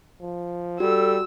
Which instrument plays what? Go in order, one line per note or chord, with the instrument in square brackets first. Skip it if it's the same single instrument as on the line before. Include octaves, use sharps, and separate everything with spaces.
[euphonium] F3
[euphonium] G3 [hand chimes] F#4 [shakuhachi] A4 [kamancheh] E6